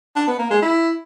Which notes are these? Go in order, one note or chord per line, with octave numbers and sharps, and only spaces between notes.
D4
B3
A#3
G#3
E4